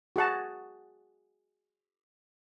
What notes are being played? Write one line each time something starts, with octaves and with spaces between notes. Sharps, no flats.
F#4 G#4 F#5 A5